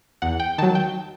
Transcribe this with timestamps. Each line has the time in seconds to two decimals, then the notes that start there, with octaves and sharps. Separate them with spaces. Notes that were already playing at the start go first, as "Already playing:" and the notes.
0.22 E2 F#5
0.40 G5
0.58 D#3 F#3 A5
0.75 G5